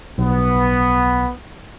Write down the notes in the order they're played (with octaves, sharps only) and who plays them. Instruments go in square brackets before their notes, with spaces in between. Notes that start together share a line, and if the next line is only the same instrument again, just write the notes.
[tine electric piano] B1 [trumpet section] B3